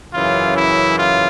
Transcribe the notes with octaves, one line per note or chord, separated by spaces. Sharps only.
F#2 C#3 E3 F4
E4
F4